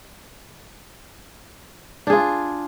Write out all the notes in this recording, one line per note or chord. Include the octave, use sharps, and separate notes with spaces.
D4 F4 G#4